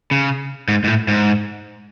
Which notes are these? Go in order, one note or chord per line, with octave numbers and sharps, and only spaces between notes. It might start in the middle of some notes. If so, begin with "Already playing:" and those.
C#3
G#2
G#2
A2
G#2